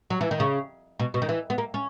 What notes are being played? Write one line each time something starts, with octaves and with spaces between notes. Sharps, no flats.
F#3
E3
D#3
C#3
B2
B2
D#3
E3
B3
A#3
C#4